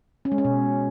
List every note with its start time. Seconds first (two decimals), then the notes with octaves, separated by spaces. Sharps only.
0.25 C#4
0.32 G#3
0.38 C#4
0.45 B2